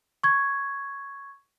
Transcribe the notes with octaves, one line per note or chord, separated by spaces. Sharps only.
C#6 G#6